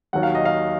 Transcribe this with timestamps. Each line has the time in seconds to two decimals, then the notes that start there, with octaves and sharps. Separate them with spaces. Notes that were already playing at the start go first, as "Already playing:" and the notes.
0.13 D#2 D#3 F#3 F#5
0.23 F5
0.35 D#5
0.45 F5